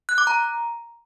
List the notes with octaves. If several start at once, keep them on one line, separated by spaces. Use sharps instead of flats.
F#6
D6
A#5